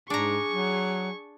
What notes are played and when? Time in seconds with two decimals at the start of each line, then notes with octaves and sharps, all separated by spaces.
0.10 G#2 D4 G#4 A#5 C#6
0.50 F#3